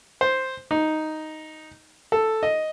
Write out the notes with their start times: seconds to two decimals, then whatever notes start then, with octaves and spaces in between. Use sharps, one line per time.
0.21 C5
0.71 D#4
2.12 A4
2.43 D#5